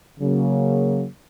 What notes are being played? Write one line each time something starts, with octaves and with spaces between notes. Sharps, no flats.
C#3 F#3 A#3